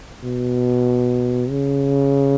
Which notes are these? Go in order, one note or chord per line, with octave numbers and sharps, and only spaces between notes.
B2
C#3